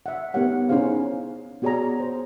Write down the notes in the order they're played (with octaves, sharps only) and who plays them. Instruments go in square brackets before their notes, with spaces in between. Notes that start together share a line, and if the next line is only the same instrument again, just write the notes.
[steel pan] E5 F#5
B3 D#4 G4 A#4 C#5 F#5
C#4 D#4 E4 G#4 C5 F5
B3 F#4 G#4 C#5 D5 A#5
C5